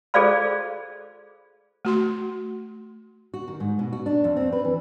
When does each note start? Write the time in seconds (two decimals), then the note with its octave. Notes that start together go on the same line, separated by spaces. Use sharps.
0.14 G#4 A4 C5 D5 F5 B5
1.85 A3 F#4 C6
3.34 F#4
3.48 D#3
3.60 G#2
3.79 B2
3.93 F#4
4.06 D4
4.24 F2
4.37 C4
4.53 B4
4.65 E3